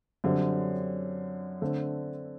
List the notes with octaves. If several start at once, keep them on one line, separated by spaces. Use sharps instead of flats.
F#2 D3 G3 C4
D3 A3 C4